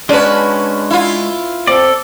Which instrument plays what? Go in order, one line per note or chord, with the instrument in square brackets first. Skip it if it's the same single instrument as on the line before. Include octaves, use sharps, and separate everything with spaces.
[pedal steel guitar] G#3 F#4 [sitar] C#4 B4 [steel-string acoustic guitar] D4 A5
[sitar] E4 F4
[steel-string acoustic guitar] C4 [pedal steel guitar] A4 D5